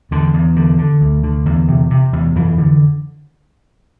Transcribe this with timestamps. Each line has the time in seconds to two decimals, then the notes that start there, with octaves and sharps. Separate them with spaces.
0.11 E2 D3
0.34 E2
0.56 D3
0.78 D3
1.01 D2
1.23 D3
1.46 E2
1.68 C3
1.91 C3
2.13 E2
2.35 F2 E3
2.58 D3